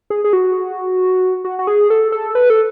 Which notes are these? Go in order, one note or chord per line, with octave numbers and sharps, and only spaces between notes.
G#4
G#4
F#4
F#4
F#4
G#4
A4
A4
B4
A4